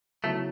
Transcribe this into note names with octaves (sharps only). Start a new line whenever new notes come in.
C#3 F#3 A3 B3 E4 A4